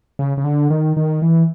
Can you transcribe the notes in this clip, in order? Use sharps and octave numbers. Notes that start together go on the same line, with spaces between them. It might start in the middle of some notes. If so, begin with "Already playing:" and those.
C#3
C#3
D3
D#3
D#3
E3